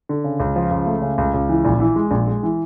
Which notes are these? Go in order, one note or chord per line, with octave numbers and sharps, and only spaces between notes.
D3
C#3
C#2
F3
C#2
A3
C#3
C#2
C#2
E3
A#1
E3
G#3
A#1
G#3
E3